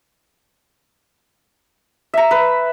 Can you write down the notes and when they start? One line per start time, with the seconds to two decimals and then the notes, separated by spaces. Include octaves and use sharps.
2.14 E5 A#5
2.31 B4